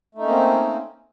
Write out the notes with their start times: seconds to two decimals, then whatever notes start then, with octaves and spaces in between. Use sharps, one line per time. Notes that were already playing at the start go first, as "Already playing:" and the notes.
0.15 A3
0.18 D#4
0.22 C#4
0.25 A#3
0.29 C4